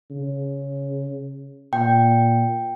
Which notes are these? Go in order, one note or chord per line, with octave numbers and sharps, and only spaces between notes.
C#3
A#2 G5